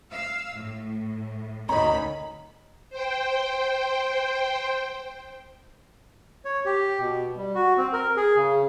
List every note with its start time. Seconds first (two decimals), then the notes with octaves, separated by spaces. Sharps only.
0.11 F5 E6
0.56 A2
1.69 D2 D#3 C#4 D#4 A#5 B5
2.90 C5 G5
6.45 C#5
6.65 G4
7.00 B2
7.37 G3
7.55 F#4
7.77 C4
7.93 A#4
8.17 G#4
8.37 C#3